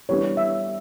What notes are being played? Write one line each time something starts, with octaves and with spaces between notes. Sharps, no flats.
E3 G3 B3 D4 C#5
E5